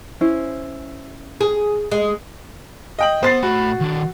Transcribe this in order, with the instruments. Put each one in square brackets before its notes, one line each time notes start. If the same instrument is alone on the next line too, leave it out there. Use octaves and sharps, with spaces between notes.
[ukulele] C#4 E4 C5
[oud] G#4
G#3
[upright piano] D#5 G5 F#7
[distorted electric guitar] B3 [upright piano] C5 A6 C7
[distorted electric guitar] A2 B5 [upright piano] F#4
[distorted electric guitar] D#3 D4